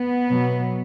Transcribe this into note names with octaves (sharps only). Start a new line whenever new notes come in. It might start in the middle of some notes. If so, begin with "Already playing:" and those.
Already playing: B3
B2 F#3